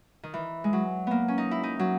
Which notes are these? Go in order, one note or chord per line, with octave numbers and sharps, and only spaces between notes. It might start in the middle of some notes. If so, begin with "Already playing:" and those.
D#3
E3
G#3
F#3
A#3 B3
C#4
D#4
E4
D#4
F#3